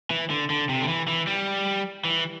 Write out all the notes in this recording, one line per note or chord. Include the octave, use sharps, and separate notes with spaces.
E3
D3
D3
C3
D3
E3
E3
G3
E3